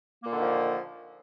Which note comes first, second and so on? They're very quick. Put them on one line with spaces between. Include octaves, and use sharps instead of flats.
A#3 A#2 D3 D#3 F3